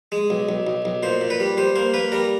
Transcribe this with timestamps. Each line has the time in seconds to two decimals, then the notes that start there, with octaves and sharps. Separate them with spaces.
0.12 G#3
0.30 B1
0.49 B1
0.67 B1
0.85 B1
1.03 A#2 C5
1.21 A#2
1.30 B4
1.40 G3
1.57 G3 C5
1.76 A#3 C5
1.94 A#3 B4
2.12 G3 A#4